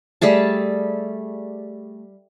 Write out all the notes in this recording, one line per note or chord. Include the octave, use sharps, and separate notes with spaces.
G3 A3 G#4 A5